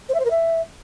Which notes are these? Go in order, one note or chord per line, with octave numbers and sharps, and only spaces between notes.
C5
E5
C5
A#4
E5